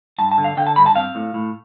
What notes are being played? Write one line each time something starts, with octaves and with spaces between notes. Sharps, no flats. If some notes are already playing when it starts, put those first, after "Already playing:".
G2 A5
A5
D3
F5
D3 G5
A5
G2 B5
A5
C4 F5
A2
A2